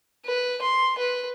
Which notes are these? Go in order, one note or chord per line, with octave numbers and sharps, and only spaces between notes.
B4
C6
B4